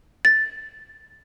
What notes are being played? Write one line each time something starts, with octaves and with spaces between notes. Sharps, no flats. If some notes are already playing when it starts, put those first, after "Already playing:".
A6